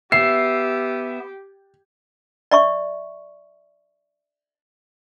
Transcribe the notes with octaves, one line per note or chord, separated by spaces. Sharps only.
B3 G4 E5 C7
D5 E5 C#6